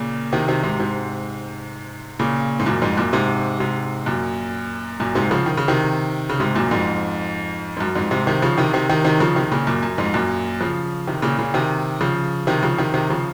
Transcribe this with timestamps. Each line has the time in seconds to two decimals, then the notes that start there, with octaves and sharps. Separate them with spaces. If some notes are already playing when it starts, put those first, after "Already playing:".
Already playing: A#2 C#3
0.33 C3 D#3
0.48 C3 D#3
0.63 G#2 C3
0.80 G#2 C3
2.19 A#2 C#3
2.59 G#2
2.66 F#2 A#2
2.82 F2 G#2
2.97 F#2 A#2
3.13 G#2 C3
3.60 G#2 C3
4.06 F#2 A#2
5.00 F#2 A#2
5.15 G#2 C3
5.31 C#3 F3
5.46 D#3
5.57 C#3
5.68 C3 D#3
6.30 C#3
6.40 G#2 C3
6.55 F#2 A#2
6.71 F2 G#2
7.77 G#2
7.80 F#2
7.95 F2 G#2
8.11 G#2 C3
8.27 C3 D#3
8.42 C#3 F3
8.58 C3 D#3
8.73 C3 D#3
8.89 C3 D#3
9.04 C3 D#3
9.20 C#3 F3
9.36 C3 D#3
9.52 A#2 C#3
9.67 F#2 A#2
9.83 F#2
9.98 F2 G#2
10.14 F#2 A#2
10.61 C#3 F3
11.07 C3 D#3
11.22 A#2 C#3
11.39 A#2 C#3
11.54 C3 D#3
12.01 C#3 F3
12.47 C3 D#3
12.63 C#3 F3
12.78 C3 D#3
12.94 C3 D#3
13.10 C#3 F3